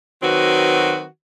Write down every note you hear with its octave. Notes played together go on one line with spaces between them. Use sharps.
D#3 F#3 C4 F#4 B4